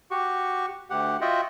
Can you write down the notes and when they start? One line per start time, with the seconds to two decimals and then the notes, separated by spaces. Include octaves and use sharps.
0.11 F#4 G4 C#6
0.90 D2 G4 F#5
1.21 F4 F#4 D#5 E5 F#5 G5